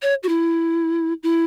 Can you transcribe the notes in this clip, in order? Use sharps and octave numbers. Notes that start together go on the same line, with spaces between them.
C#5
F#4
E4
E4